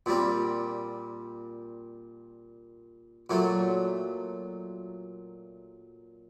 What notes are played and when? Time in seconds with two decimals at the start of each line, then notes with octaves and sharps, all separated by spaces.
0.06 A#2 G3 C4
3.30 A#2 F#3 A3